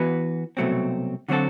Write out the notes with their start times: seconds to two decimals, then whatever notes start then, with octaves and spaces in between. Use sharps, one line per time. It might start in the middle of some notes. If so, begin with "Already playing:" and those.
Already playing: E3 B3 F#4 B4
0.57 C2 B2 F#3 A3 C4
1.29 D3 F#3 C4 F#4 A4